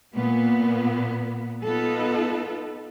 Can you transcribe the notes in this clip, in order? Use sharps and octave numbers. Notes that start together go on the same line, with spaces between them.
A#2 B3
B3 D#4 F4 A4